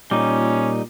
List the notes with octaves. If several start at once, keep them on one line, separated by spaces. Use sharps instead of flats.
A#2 G3 C#4 D#4 D6